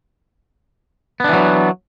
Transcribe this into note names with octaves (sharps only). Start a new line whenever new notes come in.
E3 F#3 B3 D4